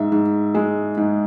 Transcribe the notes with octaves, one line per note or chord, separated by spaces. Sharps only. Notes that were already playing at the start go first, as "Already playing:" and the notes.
Already playing: G#2 E5
G#2
G#3
G#2